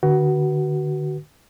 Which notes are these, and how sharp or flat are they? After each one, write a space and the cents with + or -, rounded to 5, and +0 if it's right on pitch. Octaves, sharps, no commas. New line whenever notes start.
D3 +25 F#4 +20 B4 -30